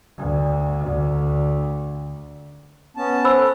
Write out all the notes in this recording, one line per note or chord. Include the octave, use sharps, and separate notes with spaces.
D2
D2
B3 C#4 A5
C5 B5 E6
A4